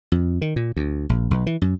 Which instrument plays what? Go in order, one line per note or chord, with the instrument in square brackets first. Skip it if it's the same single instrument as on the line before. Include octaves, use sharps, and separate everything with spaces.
[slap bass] F2
D#3
A#2
D2
A#1
B1
E3
F#2